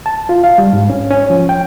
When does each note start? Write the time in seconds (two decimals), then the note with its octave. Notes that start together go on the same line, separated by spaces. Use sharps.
0.06 A5
0.29 F4
0.44 F5
0.58 G3
0.73 G#2
0.90 C#4
1.11 C#4
1.30 F3
1.49 G5